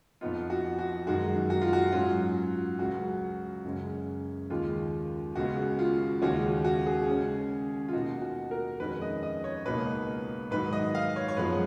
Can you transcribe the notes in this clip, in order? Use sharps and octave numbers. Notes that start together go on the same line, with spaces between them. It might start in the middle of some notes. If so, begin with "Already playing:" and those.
F2 F3 B3 D#4 F4
F#4
F#4
F#2 D#3 G#3 F#4
F#4
F4
F#4
G#2 F#3 C#4 F4
C#2 C#3 F#3 F#4
F#2 C#3 G#3 C#4
D#2 C#3 G#3 F4
C#2 C#3 G#3 B3 F#4
F4
D#2 C#3 G#3 C#4 F#4
F#4
G#4
C#3 G#3 C#4
F4
B2 A#3 D#4 F#4
F#4
A#4
F2 D#3 G#3 C#4 B4
D#5
D#5
C#5
C#2 B2 A#3 D#4 B4
G#2 D#3 F#3 B4
D#5
F5
C#5
C#5
F#2 F3 G#3 B3 D#4 B4